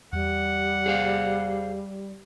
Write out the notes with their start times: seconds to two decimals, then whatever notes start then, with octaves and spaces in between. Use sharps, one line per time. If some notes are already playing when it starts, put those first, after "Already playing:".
0.13 E2 G3 F#5
0.86 G#4 C5 F5